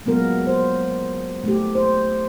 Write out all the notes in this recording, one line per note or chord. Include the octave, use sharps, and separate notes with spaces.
F#3 G#3 A#3 B3 F4 A#4
C5
A3 G4
C5